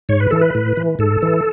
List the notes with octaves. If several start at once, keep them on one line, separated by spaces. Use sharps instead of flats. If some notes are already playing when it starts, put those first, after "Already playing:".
G#2 C#5
B4
E3 A4
B4
A2
E3
G#2 A4
E3